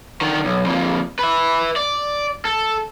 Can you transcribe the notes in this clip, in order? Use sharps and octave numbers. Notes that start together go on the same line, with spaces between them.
D3 D#3
B1
F2 A#2
B4 E5
D5
A4